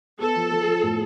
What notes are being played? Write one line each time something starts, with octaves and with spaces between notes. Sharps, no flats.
B3 A4
F3
F3
F3
A2